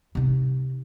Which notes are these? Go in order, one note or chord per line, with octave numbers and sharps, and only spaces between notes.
C3 D#4